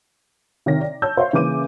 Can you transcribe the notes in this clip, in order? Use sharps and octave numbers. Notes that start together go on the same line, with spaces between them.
C3 D#3 C#5 A#6
D5
C#5 A5 E6 G6
C5 C#5 E5 F5 C6
C#3 E3 A#3 D6 D#7